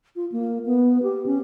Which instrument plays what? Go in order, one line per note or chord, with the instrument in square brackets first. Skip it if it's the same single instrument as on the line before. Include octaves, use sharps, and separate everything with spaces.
[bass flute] F4
A#3
B3
G4
C#4